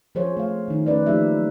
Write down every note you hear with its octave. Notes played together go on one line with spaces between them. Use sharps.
F3 G#4 C5 C#5
A3 F5
D#3 D#4
A3 C#4 B4 D5
F3 A3 A#3 D#4 G4 E5
F#3